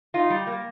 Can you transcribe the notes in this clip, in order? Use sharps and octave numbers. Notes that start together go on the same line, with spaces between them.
D#4 F4
G3
A#3